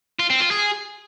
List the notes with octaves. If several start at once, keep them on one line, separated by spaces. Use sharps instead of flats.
F4
C4
F4
G#4